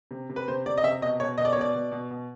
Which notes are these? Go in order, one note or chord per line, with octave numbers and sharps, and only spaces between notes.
C3
C3
B4
C3 C5
C3 D5
D#5
C3 E5
B2 D#5
B2 C#5
B2 D#5
D5
C#5
B2 D5
B2
B2
B2